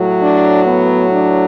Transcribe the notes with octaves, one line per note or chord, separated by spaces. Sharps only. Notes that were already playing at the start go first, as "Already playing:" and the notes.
Already playing: A2 F#3
D4
B3
D4